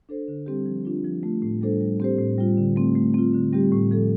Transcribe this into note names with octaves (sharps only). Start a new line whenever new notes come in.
D4 A4 C5
D3
G3 C4 G4
F3
D4 F4
F3
A3 F4
A2
G3 D4 A4 C5
G3
C4 G4 C5
A2
G3 F4
D3
A3 C4
A3
C4 F4
D3
G3 C4 G4
A2
F3 C4 A4